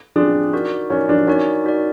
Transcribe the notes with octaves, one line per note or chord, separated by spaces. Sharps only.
C4 D4 F4 G#4
D#4 F#4 A#4 D5
C#4 D#4 F#4 A#4 D5
D4
C#4 D#4 F#4 A#4 D5
D#4 F#4 A#4 D5